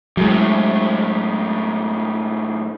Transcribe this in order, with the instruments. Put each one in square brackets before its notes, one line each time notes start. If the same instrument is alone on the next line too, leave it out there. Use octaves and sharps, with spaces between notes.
[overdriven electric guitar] F#2 A2 [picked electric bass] F#3 G#3